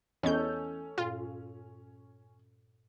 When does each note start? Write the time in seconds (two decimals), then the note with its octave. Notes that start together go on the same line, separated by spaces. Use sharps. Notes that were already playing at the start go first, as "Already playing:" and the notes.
0.23 E2 C#4 A4 C#5 D#5 G6
0.98 G2 A#2 F4